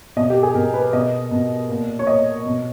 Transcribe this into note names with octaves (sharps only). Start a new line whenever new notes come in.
B2 D#5
G4
G#4
B2 A#4
B4
B2 D#5
B2
A#2
C#5
A#2 D#5
B2